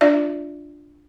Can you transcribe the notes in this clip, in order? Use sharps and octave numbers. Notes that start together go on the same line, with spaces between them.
D4 F4 D5 E5